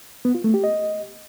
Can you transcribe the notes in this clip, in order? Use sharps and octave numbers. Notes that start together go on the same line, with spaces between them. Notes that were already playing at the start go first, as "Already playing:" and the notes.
B3
F4
A3
G4
D#5